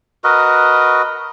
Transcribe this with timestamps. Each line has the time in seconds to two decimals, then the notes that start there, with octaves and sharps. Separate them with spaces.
0.24 F#4 A#4 B4 D#5